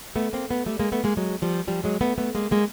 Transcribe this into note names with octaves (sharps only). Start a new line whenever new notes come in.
A3 B3
A#3 C4
A3 B3
G3 A3
G#3 A#3
A3 B3
G#3 A#3
F#3 G#3
F3 G3
F3 G3
F#3 G#3
A3 B3
A3 B3
G#3 A#3
G#3 A#3